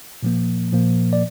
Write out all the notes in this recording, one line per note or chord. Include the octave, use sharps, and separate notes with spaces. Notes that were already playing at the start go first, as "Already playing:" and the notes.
A#2 F3 A#3
A#2 F3 A#3
D5